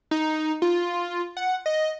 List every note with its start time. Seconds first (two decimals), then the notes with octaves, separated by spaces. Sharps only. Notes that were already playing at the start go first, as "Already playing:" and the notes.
0.11 D#4
0.62 F4
1.37 F#5
1.66 D#5